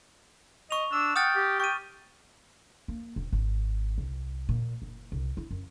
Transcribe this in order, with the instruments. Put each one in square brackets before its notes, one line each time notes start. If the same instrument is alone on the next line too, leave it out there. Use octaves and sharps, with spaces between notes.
[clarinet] D#5 [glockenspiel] C#6 F7
[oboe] D4 [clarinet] E6
[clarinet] F#5 [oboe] G5 [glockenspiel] D#6 F6 A6
[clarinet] G4
[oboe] G5 [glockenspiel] C#6 D#7
[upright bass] A#3
D#1
G#1
C2
A#2
F#1
C2
E4
F#2